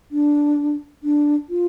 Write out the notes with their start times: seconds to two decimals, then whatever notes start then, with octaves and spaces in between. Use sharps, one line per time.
0.11 D4
1.03 D4
1.49 F4